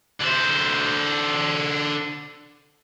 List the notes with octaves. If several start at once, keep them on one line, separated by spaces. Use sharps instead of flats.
D3 C5